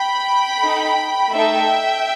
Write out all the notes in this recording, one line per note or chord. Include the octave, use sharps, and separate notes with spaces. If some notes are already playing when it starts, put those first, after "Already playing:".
Already playing: G5 B5
D#4 A4
A3 D#4 A4 E5 G5